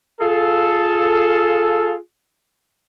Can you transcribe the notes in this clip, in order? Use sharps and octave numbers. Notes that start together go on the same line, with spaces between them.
F4 G#4 A4